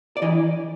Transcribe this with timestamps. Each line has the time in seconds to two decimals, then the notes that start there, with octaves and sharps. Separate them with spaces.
0.17 D5
0.22 E3 D#5